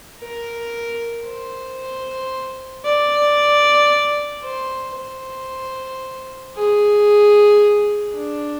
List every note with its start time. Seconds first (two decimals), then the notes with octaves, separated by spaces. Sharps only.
0.20 A#4
1.26 C5
2.85 D5
4.44 C5
4.97 C5
6.56 G#4
8.14 D4